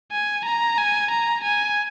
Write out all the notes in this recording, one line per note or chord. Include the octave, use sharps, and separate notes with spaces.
G#5
A#5
G#5
A#5
G#5